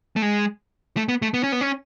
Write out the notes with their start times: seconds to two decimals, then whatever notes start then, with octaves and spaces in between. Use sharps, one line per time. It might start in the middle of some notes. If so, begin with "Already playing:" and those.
0.16 A3
0.22 G#3
0.97 A3
1.09 B3
1.22 A3
1.34 B3
1.43 C#4
1.52 B3
1.61 C#4